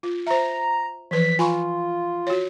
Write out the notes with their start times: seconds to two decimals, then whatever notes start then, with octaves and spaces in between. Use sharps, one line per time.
0.03 F4
0.27 C5 E5 A#5
1.11 E3 F3 B4 B6
1.39 F4 G#5 B5 C#6
2.27 F#4 C#5